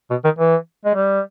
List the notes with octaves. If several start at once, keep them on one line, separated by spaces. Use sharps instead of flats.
B2
D#3
E3
G#3
G3